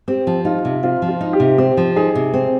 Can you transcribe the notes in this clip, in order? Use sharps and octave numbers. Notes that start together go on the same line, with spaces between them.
C4 G4
F3
D#4 F4
C3
C4 F4
F3
F4
D#4
G4
C3
C4 G4
F3
D#4 G#4
C3
C4